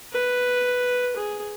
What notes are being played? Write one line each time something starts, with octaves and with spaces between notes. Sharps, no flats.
B4
G#4